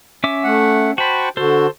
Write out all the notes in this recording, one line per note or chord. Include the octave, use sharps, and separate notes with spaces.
C#4 E5 D6
A3 F#5
F#4 C5 G5 A5 B5
D3 F#4 A4 C5